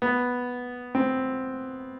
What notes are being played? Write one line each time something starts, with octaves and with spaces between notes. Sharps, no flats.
B3
C4